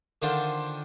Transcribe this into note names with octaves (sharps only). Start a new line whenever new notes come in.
D3 D#3 D4 F4 C5 G5